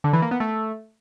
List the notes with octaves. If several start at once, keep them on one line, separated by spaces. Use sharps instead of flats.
D3
E3
A#3
B3
A3